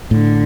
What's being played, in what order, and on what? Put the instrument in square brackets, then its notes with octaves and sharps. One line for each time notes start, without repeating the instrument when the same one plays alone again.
[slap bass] A2 [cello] D3